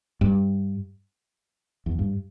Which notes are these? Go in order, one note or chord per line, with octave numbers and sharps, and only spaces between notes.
G2
E2
G2